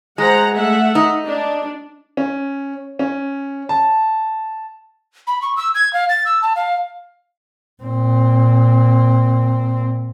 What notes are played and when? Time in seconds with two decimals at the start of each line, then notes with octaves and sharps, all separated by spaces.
0.18 G#3 C5 F#5 A#5
0.55 A3 E5 F#5
0.95 D#4
1.25 D4
2.17 C#4
2.99 C#4
3.69 A5
5.27 B5
5.42 C#6
5.56 E6
5.75 G#6
5.93 F5
6.09 A6
6.25 E6
6.42 A5
6.56 F5
7.83 A#2 C4